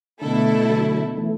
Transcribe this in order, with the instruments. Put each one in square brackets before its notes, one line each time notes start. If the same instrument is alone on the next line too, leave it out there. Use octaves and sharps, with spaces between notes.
[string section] B2 A3 E4 A4 [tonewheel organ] D3
[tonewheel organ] D3 F#3
E3 A3